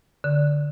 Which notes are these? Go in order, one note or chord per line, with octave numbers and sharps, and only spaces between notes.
D3